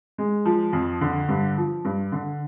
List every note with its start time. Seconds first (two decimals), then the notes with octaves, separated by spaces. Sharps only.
0.18 G#3
0.45 F3
0.73 F2
1.01 D3
1.29 G2
1.58 F3
1.85 G2
2.12 D3